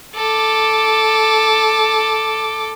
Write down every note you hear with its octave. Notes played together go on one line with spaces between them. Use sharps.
A4 D6